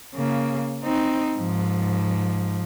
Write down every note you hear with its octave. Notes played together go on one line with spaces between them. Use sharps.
C#3 A#3
C4 D#4
G#2 F3